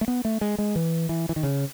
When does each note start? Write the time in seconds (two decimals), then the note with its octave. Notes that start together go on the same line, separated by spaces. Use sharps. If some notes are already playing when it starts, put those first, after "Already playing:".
0.01 A3
0.08 B3
0.25 A3
0.41 G#3
0.58 G#3
0.76 E3
1.09 E3
1.29 E3
1.36 D#3
1.43 C#3